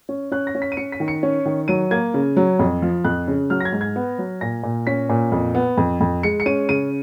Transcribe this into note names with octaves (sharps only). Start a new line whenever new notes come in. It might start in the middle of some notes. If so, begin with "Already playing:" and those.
C#4
C#4 F#6
A#6
C#4
B6
D#7
C#4 C#7
B6
D#3
C#7
C#4
D#3
F#3 D#7
A#3 G#6
C#3
F#3
F2
F3
F2 F#6
C#3
F#3 F6
A#6
G#6
G#2
G#6
B3
F#3
A#2 A#6
A#2
C#4 B6
A#2
F2
B3
F2
F2
G#3 C#7
C#7
C#4 D#7
C#3 D#7